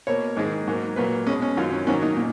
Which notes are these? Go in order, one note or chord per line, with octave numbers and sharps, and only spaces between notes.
B2 A#3 C#5
G#2 D#3 G#3
G#2 F#3 A#3
A#2 F#3 A#3 B4
B2 G#3 C#4
C#4
F#2 D#3 F#3 F4
C#4
G#2 D#3 F#3 A#3 C#4
D#4
A#2